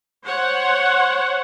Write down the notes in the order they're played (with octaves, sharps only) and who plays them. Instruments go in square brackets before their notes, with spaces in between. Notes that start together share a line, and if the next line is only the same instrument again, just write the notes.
[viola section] C5 C#5 F#5